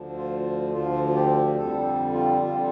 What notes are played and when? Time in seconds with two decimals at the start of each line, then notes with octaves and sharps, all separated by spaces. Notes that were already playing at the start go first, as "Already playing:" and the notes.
Already playing: D2 D3 F3
0.17 F4
0.73 D2 D3 F3 F4
1.05 F4
1.15 G4
1.58 F2 D3 G3 A4
2.14 F4
2.41 F2 D3 G3 F4